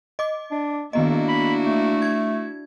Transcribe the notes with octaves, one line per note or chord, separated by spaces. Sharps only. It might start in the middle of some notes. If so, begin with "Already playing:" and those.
D#5 D6
D4
D#3 A#3 B3 D4 E4 F#4 D#5
B5
A3
G#6